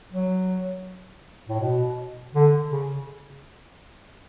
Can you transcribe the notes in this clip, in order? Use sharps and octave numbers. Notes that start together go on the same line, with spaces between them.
F#3
A2
B2
D3
C#3